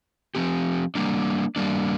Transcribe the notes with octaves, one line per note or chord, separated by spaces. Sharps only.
F3 C4 G4
G3 A#3 D4
G3 A#3 D4